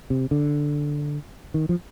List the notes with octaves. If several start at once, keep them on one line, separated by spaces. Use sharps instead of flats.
C3
D3
D#3
F3